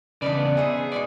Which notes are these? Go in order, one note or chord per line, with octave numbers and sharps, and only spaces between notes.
E2 C#3 D4 D#4 B4 D5
B3
D#4 G#4 C5 E5
B2 G#3 D#4 D5